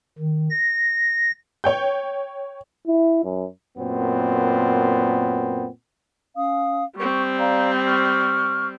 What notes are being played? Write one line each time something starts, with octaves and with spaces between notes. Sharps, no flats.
D#3
A#6
C#5 G5 G6
E4
F#2
F#2 A#2 B3 C4
C#4 F5 D#6
G3 C4 C#6
D5 F5 A#5
C#6 F6